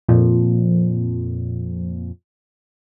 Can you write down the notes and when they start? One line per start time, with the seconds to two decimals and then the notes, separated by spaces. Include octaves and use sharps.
0.09 F2 A#2 F3